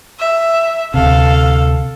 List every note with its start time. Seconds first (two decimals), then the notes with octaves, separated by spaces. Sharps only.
0.20 E5
0.94 D2 C3 A4 F5